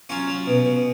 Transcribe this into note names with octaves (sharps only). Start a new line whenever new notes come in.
F#3 C#4 F4
F#3
B2
B2